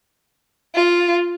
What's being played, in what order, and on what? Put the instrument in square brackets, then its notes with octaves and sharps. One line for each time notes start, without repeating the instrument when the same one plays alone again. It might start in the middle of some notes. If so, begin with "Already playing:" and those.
[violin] F4